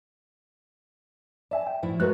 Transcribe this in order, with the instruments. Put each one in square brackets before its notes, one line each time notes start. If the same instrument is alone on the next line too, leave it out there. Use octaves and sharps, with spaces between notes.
[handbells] D5 E5 G#5 [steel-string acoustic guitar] A5
[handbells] G5
[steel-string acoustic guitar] A2 F3 E4
[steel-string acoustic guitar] G#3 A3 F#4 [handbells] A#4 B4 F#6